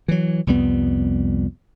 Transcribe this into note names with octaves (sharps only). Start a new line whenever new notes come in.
E3 F#3
C2 F2 G3 B3